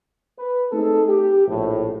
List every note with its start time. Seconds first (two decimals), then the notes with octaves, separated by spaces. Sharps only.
0.38 B4
0.71 A3 C4 D#4 G#4 A4
1.08 G4
1.48 A#1 A2